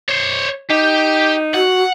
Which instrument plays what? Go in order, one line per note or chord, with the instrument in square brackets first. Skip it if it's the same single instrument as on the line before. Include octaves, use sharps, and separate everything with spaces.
[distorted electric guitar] C5 C#5
[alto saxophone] D#4 [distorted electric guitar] G4
[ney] F#4 [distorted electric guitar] F#5